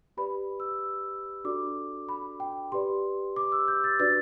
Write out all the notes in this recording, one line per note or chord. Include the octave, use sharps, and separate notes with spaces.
G4 B4 D5 B5
E6
D4 F#4 A4 D5 D6
B5
G5
G4 B4 D5 C6
D6
E6
G6
A6
D4 F#4 B4 D5 A6